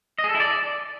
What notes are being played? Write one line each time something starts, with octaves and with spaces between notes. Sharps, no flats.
D#5
G#4
A4
E4
D5